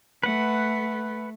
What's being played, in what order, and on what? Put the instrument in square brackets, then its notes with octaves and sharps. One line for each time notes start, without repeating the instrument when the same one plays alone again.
[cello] A3 [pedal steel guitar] B4 F#5